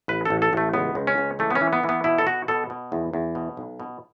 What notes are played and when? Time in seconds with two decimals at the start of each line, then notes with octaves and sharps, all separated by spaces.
0.08 A1 B4
0.25 A1 A4
0.42 A4
0.53 A1 A3
0.74 C#2 B3
0.95 C#2
1.07 C#4
1.18 C#2
1.39 E3 A3
1.51 B3
1.55 C#4
1.61 E3
1.73 B3
1.84 E3
1.89 B3
2.04 B2 E4
2.18 A4
2.27 B2 F#4
2.48 B2 A4
2.70 B2
2.92 E2
3.14 E2
3.35 B2
3.57 B1
3.80 B2